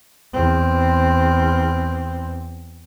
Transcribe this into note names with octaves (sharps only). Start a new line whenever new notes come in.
E2 C4